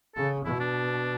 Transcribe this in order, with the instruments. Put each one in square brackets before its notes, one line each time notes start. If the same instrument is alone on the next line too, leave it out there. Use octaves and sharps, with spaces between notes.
[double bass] C#3 [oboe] A4
[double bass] B2 [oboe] E4
[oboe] D4